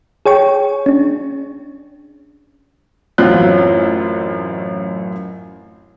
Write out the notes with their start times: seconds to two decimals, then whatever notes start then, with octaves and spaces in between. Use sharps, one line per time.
0.26 G#4 C#5 G5 C#6
0.86 C#4 D4
3.18 A1 F#2 F#3 C4 F4 F#6